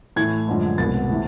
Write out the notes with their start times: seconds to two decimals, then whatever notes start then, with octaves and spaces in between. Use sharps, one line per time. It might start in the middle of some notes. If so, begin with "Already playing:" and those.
0.16 A2 E3 A3 G#6
0.48 F#2 D3 F3 G#3
0.78 C2 B2 G#3 B3 A6
1.10 C3 E3 A3